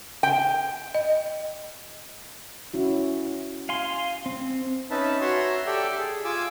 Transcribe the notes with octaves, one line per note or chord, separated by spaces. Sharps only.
G5
D#5
C#4 E4 F#4
F5 G#5 C6
C4
C#4 D#4 B4 E5 A5
F#4 C#5 E5 A#5 C6
G4 A4 D5 E5 G5
G#4
F4 G#5 D6 E6